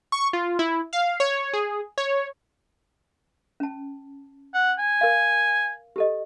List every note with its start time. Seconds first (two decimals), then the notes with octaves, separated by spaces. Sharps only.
0.12 C#6
0.33 F4
0.59 E4
0.93 F5
1.20 C#5
1.53 G#4
1.98 C#5
3.60 C#4 A5
4.54 F#5
4.79 G#5
5.01 A#4 F5
5.96 G4 A4 D#5